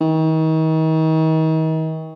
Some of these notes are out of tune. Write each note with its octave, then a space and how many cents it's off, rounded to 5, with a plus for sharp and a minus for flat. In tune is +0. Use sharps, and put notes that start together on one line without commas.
D#3 +40